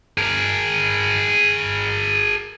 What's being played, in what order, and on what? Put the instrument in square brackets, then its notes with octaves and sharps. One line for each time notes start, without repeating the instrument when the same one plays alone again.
[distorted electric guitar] G#4 A#4